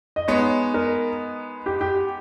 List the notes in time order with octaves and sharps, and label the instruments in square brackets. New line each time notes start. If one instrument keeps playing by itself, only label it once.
[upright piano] D#5
[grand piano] G#3 B3 D#4 [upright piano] C#5
[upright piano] A#4
G4
G4